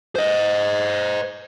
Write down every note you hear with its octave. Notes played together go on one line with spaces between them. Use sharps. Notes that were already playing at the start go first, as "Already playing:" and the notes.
C5 D#5